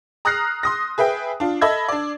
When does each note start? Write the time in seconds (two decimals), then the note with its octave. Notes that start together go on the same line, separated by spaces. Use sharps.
0.25 A#5 D#6 F6 F#6 A#6 C7
0.63 C6 D#6 A#6
0.98 G#4 B4 E5 G5
1.40 D4 F4
1.61 A4 D#5 E5 B5 E6 G#6
1.89 D4 D5